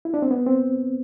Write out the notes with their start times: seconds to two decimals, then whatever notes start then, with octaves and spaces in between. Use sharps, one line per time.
0.05 E4
0.14 D4
0.22 C4
0.31 B3
0.47 C4